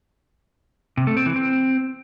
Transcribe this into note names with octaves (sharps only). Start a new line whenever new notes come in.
C3
A3
C4
E3
C4